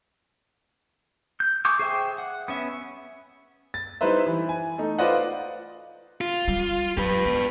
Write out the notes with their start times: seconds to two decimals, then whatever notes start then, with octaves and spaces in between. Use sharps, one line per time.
1.40 G6
1.65 G#4 C#6 D6 G6
1.79 G#4 C5 E5 G5
2.18 F#5
2.48 B3 C#4 E5
3.74 A6
4.01 G3 D#4 E4 B4 C5 E5
4.27 E3
4.49 G#5
4.78 A3 D#4
4.99 F4 B4 C5 D5 D#5 F#5
6.21 F4
6.48 G3
6.97 F#3 G4 B4
7.26 B3